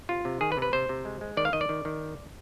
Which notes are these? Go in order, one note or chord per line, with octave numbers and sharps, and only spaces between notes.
C3 F4
C3
D#3 G#4
B4
C3
B4
C3 C5
C3
G#3
G#3
D#3 D5
F5
D#3 D#5
D5
D#3
D#3